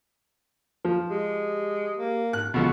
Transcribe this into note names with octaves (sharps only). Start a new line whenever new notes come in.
F3
G#3 G4
A#3
G#2 F#6
C#2 B2 F3 A4